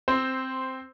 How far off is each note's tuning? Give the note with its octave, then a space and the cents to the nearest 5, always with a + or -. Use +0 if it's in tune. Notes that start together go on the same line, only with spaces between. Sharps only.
C4 +0 C5 -5